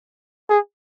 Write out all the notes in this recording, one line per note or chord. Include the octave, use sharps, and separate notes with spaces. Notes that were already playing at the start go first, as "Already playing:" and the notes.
G#4